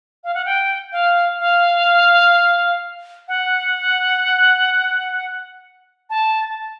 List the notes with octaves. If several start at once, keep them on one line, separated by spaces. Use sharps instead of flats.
F5
F#5
G5
F5
F5
F#5
A5